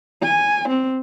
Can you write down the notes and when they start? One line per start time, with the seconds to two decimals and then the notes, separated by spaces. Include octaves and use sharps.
0.22 G#5
0.69 C4